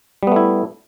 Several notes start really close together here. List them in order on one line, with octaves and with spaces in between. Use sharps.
G3 B3 A3 E4